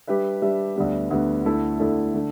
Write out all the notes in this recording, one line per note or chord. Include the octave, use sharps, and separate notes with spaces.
G3 D4 G4 B4 E5
G3 D4 G4 B4 E5
D2 D3 G3 B3
D2 D3 G3 B3
D2 D3 A3 E4 A4
D2 D3 A3 E4 A4
D3 A3